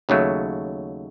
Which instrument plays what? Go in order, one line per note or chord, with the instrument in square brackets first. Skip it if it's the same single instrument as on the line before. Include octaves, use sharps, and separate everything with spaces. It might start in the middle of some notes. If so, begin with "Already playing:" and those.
[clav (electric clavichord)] D#2 C#3 F#3 A3